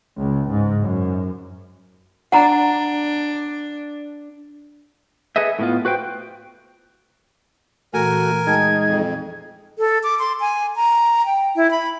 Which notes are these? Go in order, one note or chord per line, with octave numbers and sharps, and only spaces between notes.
C#2
G#2
F#2
D4 F#5 A#5 B5
G#4 A4 B4 D#5 E5
A2 B3 F4
F#4 B4 C5 G5
A#2 E3 A3 F#4 A#4 G#5
G#3 D#4 G5 A5 A#5 G#6
F2
A4
D6
C6
G#5
A#5
G5
E4
B5